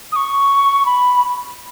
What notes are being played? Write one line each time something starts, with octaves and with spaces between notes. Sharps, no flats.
D#6
C#6
B5